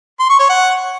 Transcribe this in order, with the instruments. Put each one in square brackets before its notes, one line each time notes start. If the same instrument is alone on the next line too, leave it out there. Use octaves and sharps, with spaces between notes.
[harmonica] C6
C#6
C#5
F#5